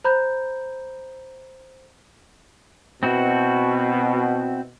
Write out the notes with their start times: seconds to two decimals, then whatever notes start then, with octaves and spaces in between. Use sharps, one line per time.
0.05 C5 A#5 B5 G6
3.03 B2 C4 E4 F#4